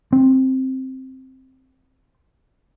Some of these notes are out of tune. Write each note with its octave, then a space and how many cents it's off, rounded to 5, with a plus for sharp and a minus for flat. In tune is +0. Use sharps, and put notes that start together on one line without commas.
C4 +5